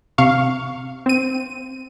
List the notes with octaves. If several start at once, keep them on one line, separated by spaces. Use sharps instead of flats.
C3 F5 C#6
C4 D#7